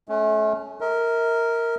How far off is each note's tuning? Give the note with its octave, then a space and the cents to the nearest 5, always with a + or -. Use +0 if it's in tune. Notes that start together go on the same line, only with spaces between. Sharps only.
A3 -35 C#4 +0
A#4 -5 E5 -45